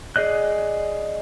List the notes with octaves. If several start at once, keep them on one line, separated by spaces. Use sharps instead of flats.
G#4 D5 D#5 F#6